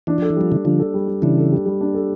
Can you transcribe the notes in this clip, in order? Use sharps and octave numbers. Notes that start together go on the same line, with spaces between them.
E3 D4
F3 A4
E3
F3 G3
C#3 E3 G3
D3 F3 D4
A4
G3
G3
C#3 E3 D4
A4
G3
G3
D4
A4